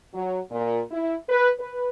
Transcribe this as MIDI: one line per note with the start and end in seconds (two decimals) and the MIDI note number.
0.14 0.38 54
0.51 0.80 46
0.91 1.14 64
1.29 1.48 71
1.60 1.89 71